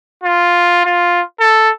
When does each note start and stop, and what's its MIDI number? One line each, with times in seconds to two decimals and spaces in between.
0.24 0.85 65
0.85 1.21 65
1.40 1.70 69